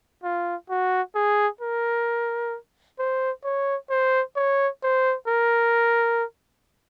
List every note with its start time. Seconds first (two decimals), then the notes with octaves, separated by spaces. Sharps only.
0.23 F4
0.70 F#4
1.15 G#4
1.61 A#4
2.99 C5
3.44 C#5
3.90 C5
4.36 C#5
4.83 C5
5.27 A#4